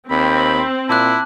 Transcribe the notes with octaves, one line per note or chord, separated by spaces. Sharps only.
D#2 C4 B5
F#7
A#2 E4 A5 D6 F#6